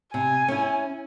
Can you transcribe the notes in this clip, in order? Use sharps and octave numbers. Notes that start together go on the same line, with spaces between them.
C3 G#5
C#4 E4